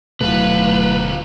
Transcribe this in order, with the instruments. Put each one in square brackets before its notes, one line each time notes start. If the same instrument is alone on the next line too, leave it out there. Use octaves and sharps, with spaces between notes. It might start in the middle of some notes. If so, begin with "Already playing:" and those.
[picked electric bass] D1 B2 A3 [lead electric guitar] D2 F4 [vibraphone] F#3 E4 [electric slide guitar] B4